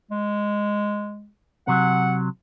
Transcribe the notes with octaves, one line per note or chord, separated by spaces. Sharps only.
G#3
C3 F#3 F#5